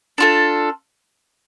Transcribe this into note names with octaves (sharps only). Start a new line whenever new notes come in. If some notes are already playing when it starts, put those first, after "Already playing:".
D4 F4 A4